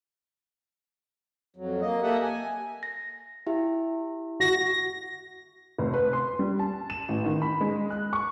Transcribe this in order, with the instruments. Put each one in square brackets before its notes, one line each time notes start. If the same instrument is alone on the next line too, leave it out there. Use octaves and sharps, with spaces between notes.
[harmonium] F2 F#3
A#3 D#5
A#3 G4 A4 D#5 E5 F#5
G#5
[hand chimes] A#6
E4 G4 E5
[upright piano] F#4 [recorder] A#6
[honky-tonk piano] F1
B4
C6
G3
A5
E7
A1
D#3
B5
G#3
F#6
C#6